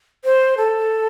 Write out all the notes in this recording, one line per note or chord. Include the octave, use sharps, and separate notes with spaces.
C5
A4